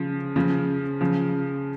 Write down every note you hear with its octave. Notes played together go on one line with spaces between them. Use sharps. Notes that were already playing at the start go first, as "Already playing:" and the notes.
Already playing: C#3 F3
C#3 F3
C#3 F3